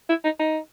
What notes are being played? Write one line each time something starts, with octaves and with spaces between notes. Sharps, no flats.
E4
D#4
D#4